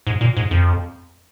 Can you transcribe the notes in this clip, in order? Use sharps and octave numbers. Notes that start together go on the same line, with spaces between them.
G#2
A#2
G#2
F2